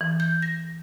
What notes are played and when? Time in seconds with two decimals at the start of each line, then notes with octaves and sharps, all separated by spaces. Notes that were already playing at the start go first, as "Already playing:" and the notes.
0.01 E3
0.20 G6
0.42 A#6